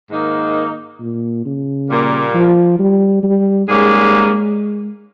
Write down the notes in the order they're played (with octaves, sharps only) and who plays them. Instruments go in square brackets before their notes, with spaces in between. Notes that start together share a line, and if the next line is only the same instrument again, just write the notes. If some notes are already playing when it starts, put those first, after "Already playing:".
[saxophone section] G#2 D#3 A#3 D#4
[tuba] A#2
C#3
[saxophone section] A#2 G3 A#3
[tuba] F3
G3
G3
[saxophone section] G#2 G3 A#3 C#4 G#4 [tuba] G#3